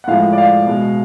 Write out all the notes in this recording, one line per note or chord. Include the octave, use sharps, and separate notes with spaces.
F#5
A2 F3 G#3 F5
D5
F5
B2 G#3